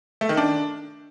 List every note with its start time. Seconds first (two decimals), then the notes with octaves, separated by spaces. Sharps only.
0.21 A3
0.29 D#3
0.37 D4